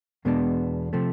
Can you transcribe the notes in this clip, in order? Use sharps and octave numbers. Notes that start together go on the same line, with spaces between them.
E2 B2 G#3 B3 D4
C3 F3 A3